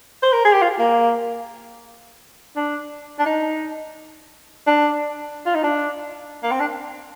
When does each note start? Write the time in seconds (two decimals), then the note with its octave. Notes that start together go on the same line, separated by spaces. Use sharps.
0.22 C5
0.33 A#4
0.44 G#4
0.53 G4
0.62 F4
0.79 A#3
2.56 D4
3.19 D4
3.26 D#4
4.67 D4
5.46 F4
5.55 D#4
5.63 D4
6.43 A#3
6.51 C4
6.60 D4